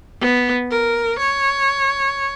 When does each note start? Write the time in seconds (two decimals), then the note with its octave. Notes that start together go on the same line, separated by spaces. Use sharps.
0.21 B3
0.71 A#4
1.19 C#5